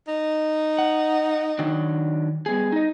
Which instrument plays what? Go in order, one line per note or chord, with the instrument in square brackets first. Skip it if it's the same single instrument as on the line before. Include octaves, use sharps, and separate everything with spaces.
[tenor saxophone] D#4
[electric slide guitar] F#5
D#3 F#3 D4
G3 B3 G#4
D#4 D#5